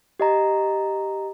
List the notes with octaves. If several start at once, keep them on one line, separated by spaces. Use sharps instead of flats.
G4 D#5 A#5